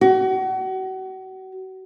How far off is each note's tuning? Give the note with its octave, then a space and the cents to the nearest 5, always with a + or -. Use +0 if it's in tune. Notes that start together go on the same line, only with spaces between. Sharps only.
F#4 +35